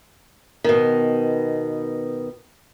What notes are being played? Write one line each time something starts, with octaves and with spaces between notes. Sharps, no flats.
B2 D#3